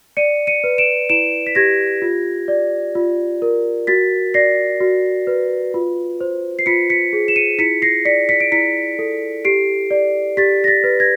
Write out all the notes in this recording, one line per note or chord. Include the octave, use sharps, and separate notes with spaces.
D5 C#7 D#7
C#7 D#7
B4
D7 E7
E4 D7 E7
B6
G4 G#6 A#6
F4
D5
F4
A#4
F#4 A6 B6
D5 A#6 C7
F#4
B4
F4
C5
C7
F4 B6 C#7
B6 C#7
G#4
E7
C#7 D#7
E4 B6 C#7
A#6 C7
D5 B6 C#7
B6 C#7
D7
E4 B6 C#7
A4
G4 C7 D7
D5
G4 A6 B6
A#6
A6 B6
B4
G#6 A#6